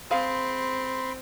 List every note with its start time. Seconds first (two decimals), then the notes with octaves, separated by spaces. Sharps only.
0.11 C4 G#4 F5 B5 C6